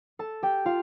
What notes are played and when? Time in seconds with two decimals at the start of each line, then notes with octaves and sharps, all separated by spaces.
0.19 A4 A5
0.43 G4 G5
0.66 F4 F5